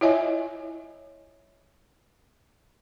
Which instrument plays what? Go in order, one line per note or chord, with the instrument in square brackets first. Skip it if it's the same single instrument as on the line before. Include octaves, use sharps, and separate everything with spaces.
[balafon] E4 F4 C#5 D#5 E5 G#5